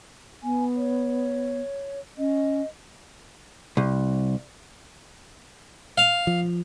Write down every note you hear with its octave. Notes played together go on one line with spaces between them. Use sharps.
B3 G#5
C#5
C#4 D#5
C2
F5
F3